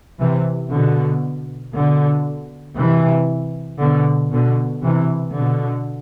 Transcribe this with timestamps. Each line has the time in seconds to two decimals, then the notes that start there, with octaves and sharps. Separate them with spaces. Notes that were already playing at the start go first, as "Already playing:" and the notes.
0.20 C3 E3
0.72 B2 D3
1.74 B2 D3
2.77 C3 E3
3.80 B2 D3
4.33 B2 D3
4.84 C3 E3
5.36 B2 D3